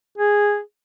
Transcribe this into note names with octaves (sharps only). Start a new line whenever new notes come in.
G#4